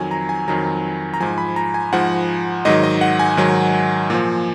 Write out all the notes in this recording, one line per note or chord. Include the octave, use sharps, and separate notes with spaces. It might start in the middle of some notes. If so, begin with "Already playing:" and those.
Already playing: F2 D#3 F#3 G#5
A#5
G#5
F2 D#3 F#3 A#5
A#5
G#2 F3 G#5
B5
A#5
G#5
G#2 F3 F#5
G#2 D#3 F#3 D#5
D#5
F#5
G#5
G#2 D#3 F#3
A#2 F3